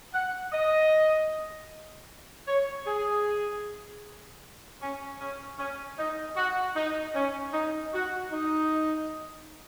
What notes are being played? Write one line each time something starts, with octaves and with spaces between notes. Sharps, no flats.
F#5
D#5
C#5
G#4
C#4
C#4
C#4
D#4
F#4
D#4
C#4
D#4
F#4
D#4